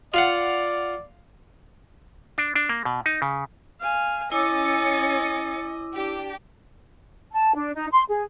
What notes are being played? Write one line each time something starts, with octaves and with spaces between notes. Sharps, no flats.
F4 D5 F5 F#5
D4
D4
A#3
B2
D#4
C#3
F5 G#5
C#4 E4 D#5 G#5 D6 E6 A6 C#7
D4 G4
A5
D4
D#4
C6
G#4